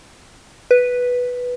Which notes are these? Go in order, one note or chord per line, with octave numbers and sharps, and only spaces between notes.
B4